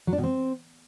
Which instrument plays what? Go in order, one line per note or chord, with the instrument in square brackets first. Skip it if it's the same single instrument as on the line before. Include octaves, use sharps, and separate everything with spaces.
[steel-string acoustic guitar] F#3
D4
B2
C4